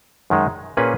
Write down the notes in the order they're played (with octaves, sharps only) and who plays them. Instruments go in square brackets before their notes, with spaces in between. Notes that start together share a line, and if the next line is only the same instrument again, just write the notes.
[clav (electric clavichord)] F#2 D#3 G#3
A#2 A#3 C#4 G#4 B4